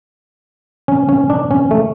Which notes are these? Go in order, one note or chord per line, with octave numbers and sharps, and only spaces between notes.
C#4
C#4
D4
C#4
A3